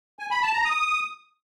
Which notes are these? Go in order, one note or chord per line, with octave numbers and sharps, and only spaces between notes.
G#5
B5
A5
A#5
D#6